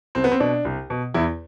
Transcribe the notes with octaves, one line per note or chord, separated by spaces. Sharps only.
C2 C4
B3
C4
B2 D4
C2
B2
E2 E4